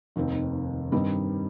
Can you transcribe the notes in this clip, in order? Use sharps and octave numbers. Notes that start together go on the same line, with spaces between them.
F1 D#2 D#3 C4
G2 D#3 G3 C4 D#4